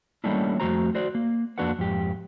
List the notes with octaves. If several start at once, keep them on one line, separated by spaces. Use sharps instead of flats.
G3 A3 A#3 C#4 D4 E4
F2 D#3 A3 F#4 C5 A#5
F#4 C5 D5
A#3
F2 A#3 D4 F#4 B4 F#5
F2 G#2 G4